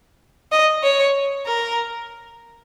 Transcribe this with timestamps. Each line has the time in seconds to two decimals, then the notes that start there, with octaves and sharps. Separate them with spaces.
0.52 D#5
0.84 C#5
1.46 A#4